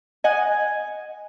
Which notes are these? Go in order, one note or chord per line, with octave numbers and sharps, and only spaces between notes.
D#5 F#5 G#5